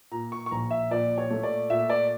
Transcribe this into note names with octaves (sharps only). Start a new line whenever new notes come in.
A#2 A#5
C#6
C#6
A#1 A#5
E5
A#2 D5
C#5
A3
D5
A#2 E5
D5